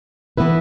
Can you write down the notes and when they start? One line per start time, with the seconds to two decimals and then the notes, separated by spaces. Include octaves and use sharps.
0.37 E3 B3 E4 B4